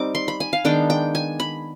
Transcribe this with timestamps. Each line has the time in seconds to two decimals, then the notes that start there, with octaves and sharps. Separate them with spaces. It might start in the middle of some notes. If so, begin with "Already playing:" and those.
Already playing: G3 C4 D#4 D6
0.15 C6
0.28 B5
0.40 G#5
0.53 F5
0.65 D#3 G#3 B3 D4 G5
0.90 G5
1.15 G#5
1.40 B5